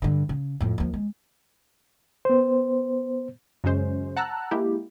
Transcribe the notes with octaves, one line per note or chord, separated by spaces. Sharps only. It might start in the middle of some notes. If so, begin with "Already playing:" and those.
G2 D3
C#3
F2 A2
D#2 F3
G#3
B3 C5
F#2 C#3 G#3 C#4 C5
F#5 A5 A#5 E6 F#6
G#3 A#3 E4 G4